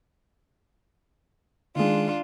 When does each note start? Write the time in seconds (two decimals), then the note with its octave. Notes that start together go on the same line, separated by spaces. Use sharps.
1.76 D#3 G#3 D4 F4